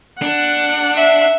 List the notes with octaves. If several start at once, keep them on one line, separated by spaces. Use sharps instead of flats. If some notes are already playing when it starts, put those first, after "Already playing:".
D4 F#5
E5